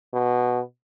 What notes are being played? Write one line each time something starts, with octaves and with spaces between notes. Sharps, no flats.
B2